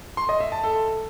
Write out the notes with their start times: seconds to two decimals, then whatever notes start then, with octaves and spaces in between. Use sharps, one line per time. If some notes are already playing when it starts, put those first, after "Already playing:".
0.17 C6
0.29 D#5
0.40 E5
0.52 A5
0.64 A4